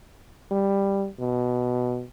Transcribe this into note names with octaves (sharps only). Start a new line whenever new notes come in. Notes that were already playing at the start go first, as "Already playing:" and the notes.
G3
B2